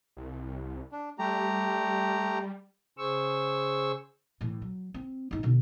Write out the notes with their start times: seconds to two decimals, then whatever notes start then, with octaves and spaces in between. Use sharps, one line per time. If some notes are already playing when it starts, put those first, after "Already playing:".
0.17 C2
0.92 D4
1.19 G3 A3 G4 A#5
2.98 C#3 G#4 C5 C#6 E6
4.41 A2 E3
4.62 F#3
4.94 C4
5.31 G1 D#4
5.43 B2 D3